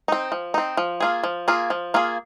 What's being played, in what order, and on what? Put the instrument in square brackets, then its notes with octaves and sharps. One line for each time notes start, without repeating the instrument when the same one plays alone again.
[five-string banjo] C4 D#4
F3
C4 D#4
F3
A#3 F4 G#4
F3
A#3 F4 G#4
F3
A#3 F4 G#4